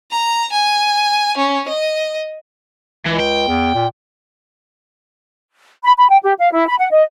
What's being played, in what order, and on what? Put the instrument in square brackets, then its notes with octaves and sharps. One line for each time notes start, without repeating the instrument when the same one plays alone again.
[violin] A#5
G#5
C#4
D#5
[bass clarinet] C#2 [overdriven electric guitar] E3
[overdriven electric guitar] G5
[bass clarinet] E2
A#2
[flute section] B5
B5
G5
G4
F5
E4
B5
F#5
D#5